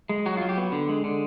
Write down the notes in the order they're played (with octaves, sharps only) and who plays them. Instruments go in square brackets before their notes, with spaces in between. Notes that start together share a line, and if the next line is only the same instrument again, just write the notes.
[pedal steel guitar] G#3
F#3 F#4
F4
F#3
G4
B3
D3
G#3
D3